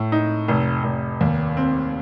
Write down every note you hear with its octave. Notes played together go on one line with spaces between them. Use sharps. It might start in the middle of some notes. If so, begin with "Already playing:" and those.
Already playing: A2
D#4
F1
F1
D#2
C4